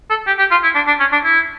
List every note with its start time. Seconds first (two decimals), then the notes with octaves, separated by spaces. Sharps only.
0.10 A4
0.27 G4
0.39 G4
0.51 F4
0.63 E4
0.75 D4
0.87 D4
1.00 C#4
1.13 D4
1.24 E4